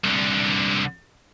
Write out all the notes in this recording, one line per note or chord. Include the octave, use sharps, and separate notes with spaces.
C2 D3